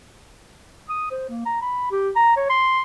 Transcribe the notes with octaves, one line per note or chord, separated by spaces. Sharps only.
D#6
C5
A#3
A#5
B5
G4
A#5
C#5
C6